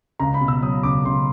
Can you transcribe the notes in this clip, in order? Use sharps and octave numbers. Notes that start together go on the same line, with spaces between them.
C#2 A#5
B5
B2
E6
F#3 D#6
C#2 D6
C#2 C6